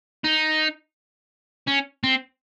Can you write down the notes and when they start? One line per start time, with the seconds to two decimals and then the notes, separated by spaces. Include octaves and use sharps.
0.24 D#4
1.68 C#4
2.04 C4